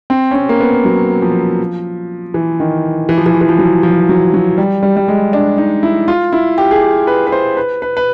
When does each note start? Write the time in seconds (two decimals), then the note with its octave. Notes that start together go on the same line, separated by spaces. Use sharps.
0.10 C4
0.31 C#4
0.35 C4
0.49 A#3
0.60 B3
0.85 F#3
1.22 F3
2.34 E3
2.60 D#3
3.09 E3
3.18 F3
3.26 E3
3.34 F3
3.41 E3
3.49 F3
3.59 F#3
3.83 F3
4.09 F#3
4.34 F#3
4.58 G3
4.83 G3
4.97 G3
5.08 G#3
5.33 D4
5.58 D#4
5.83 E4
6.08 F4
6.33 E4
6.58 G4
6.71 G#4
6.82 G4
7.07 B4
7.27 B4
7.32 C5
7.57 B4
7.82 B4
7.97 B4